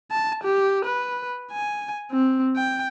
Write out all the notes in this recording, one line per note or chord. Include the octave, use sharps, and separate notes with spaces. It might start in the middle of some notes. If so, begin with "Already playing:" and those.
A5
G4
B4
G#5
C4
G5